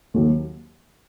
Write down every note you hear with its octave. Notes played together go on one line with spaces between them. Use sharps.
D#2 D#3 F#3